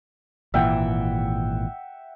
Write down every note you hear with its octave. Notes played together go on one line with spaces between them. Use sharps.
G#1 A#2 E3 E5 F#5 G5